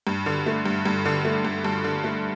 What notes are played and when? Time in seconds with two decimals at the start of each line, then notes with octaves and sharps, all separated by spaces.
0.07 G2
0.26 D3
0.46 A3
0.66 G2
0.85 G2
1.05 D3
1.25 A3
1.45 G2
1.64 G2 A5
1.84 D3
2.04 A3